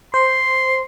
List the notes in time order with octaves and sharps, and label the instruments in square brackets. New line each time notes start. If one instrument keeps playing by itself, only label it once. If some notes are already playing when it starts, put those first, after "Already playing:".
[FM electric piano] C5 [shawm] C6